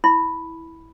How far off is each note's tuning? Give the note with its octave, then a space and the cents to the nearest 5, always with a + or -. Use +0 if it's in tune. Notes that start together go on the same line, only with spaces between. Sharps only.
E4 -10 B5 +0